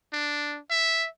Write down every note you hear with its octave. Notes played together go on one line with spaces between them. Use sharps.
D4
E5